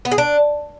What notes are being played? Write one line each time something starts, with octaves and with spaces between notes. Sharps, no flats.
B3
G#4
D4